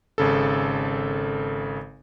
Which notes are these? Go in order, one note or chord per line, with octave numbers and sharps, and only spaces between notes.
G#1 C#3 A4